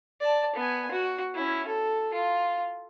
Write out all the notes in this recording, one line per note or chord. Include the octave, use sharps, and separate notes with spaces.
D5 A5
B3 G#5
F#4
C#4 E4
A4
F4